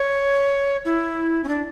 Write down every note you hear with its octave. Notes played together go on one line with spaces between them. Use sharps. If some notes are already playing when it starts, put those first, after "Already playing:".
Already playing: C#5
E4
C#4
D4